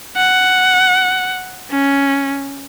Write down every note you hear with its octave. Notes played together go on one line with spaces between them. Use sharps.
F#5
C#4